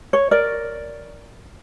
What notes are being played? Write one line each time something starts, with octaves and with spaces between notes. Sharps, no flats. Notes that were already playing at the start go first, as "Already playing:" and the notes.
C#5
A#4 D5